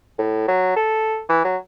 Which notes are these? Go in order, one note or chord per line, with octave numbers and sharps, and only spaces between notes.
A2
F#3
A4
E3
F#3